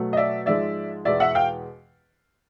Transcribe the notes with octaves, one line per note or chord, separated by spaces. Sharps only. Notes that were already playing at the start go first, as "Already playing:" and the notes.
Already playing: B2 F#3 A3
D#5
D5 E5
G#2 F3 G#3 D5 E5
E2 B2 G#3 D5 E5
E5 F#5
F5 G5